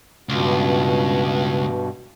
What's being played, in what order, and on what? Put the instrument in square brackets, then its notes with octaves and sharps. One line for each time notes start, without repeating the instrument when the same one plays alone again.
[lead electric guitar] C#2 [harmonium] G2 B2